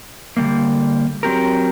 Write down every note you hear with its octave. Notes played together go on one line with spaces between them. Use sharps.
D3 G3 A#3
F#3 C4 G4 A#4